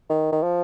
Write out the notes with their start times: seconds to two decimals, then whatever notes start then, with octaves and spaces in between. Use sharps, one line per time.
0.09 D#3
0.32 D#3
0.43 F3